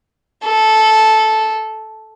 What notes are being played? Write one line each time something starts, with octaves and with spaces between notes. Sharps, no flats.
A4